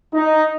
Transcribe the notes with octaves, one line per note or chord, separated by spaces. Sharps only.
D#4